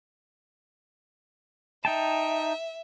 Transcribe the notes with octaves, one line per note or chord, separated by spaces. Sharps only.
D#4 E5 G5 A5